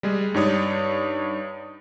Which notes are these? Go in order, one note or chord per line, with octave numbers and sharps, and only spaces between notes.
G3 G#3 G#4
G2 D#4 G4 C#5 D5 D#6